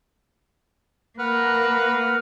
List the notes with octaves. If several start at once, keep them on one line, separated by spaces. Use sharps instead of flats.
A#3 B4 F#5 F6